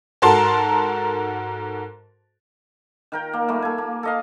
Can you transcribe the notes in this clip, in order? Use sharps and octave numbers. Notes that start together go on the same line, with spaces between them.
G#2 F#4 A4 A#4 A5 C6
D#3 A#4 G5
A#3
G3 A3 A#3
A4 G#5
A#3
A4 D#5 F5